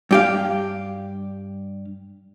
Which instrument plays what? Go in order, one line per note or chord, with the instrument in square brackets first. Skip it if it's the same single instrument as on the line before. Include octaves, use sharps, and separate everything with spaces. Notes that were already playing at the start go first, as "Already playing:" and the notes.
[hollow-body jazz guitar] G2 G4 F5